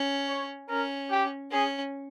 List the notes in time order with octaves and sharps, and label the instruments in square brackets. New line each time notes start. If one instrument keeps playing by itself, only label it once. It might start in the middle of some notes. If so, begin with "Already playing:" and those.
Already playing: [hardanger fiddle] C#4
[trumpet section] C#5
[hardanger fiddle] C#4 [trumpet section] A#4
[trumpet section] G4
[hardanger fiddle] C#4 [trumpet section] G#4